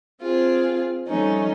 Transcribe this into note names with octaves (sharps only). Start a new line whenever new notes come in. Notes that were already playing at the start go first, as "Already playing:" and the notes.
C4 F4 G#4
F3 G3 A3 C#4 D#4